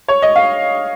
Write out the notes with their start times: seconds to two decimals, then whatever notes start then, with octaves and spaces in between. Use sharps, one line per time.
0.08 C#5
0.22 D#5
0.36 F5